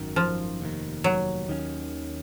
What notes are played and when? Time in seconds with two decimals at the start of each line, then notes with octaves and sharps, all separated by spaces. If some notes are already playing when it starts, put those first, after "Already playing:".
Already playing: G#1 F#2 D#3
0.16 F3
0.60 F1 D#2 D#3
1.04 F#3
1.48 D#2 D#3 A#3 C#4